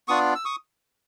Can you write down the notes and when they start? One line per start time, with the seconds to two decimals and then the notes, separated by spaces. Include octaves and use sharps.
0.08 B3 D4 F4 C#6 D#6
0.35 E6
0.45 C#6 D#6